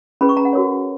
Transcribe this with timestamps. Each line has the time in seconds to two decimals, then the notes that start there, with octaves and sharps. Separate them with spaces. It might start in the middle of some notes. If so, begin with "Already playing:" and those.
0.21 C#4 G#4 B4 B5
0.29 C#6
0.37 A#5
0.45 F#5
0.53 F#4 A#4 C#5